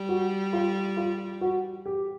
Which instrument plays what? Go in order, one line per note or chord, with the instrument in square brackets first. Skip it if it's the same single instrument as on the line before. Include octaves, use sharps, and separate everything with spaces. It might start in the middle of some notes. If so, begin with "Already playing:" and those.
Already playing: [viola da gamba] G3
[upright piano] F#4
F4
F4
F#4
G4